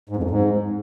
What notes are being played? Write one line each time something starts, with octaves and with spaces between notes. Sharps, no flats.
G#2
F2
F#2
G#2